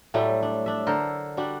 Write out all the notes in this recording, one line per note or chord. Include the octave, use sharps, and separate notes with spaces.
A2 F#3 G3 A3
D4
D4 E5
D3 A4 A#4 C5
G3 D4 F#4